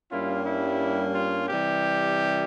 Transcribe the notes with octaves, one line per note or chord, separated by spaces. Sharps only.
G2 G3 A#3 C#4 E4 F4
E4
F4
C3 E3 G3 G4